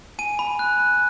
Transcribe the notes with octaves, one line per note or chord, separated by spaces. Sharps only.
G#5 D#7
B5
F#6
F#6